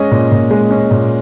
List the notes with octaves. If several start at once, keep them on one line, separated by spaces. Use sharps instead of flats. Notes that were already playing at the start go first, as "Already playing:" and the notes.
Already playing: G#3 C#4 D#5
A#2
A#2
G#3
C#4
A#2